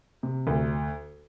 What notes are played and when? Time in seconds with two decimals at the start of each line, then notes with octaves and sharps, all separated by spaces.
0.23 C3
0.47 D2